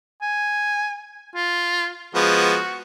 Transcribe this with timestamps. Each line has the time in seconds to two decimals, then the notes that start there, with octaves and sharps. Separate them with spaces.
0.22 G#5
1.35 F4
2.15 F3 G#3 B3 F#4